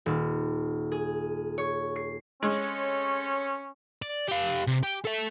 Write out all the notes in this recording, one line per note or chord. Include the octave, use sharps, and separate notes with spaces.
D#1
G#4
C#5
C7
G#3 C4 C#4 A4 C#5
D5
G4 F5
C3
G4
A4 E5